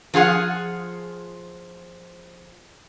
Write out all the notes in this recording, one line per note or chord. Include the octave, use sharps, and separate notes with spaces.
F3 F4 G#4 F#5